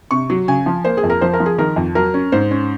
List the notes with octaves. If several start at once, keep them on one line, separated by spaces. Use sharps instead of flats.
C3 C#6
F#3
C#3 G#5
F3
A#3 C5
G#4
F2
A#4
F3 C5
A#4
F3
G#4
D#3 A#4
F2
F#3 A#4
C#4
G#2 C5
C#4